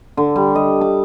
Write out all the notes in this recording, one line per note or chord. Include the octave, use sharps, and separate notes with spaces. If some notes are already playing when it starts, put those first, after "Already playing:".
D3
G3
D#5
D6